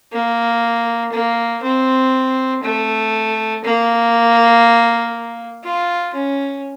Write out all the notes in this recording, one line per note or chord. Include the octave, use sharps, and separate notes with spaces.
A#3
A#3
C4
A3
A#3
F4
C#4